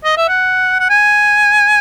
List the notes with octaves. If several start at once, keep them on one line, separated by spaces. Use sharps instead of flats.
D#5
E5
F#5
F#5
G#5